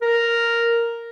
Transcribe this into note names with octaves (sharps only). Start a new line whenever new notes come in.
A#4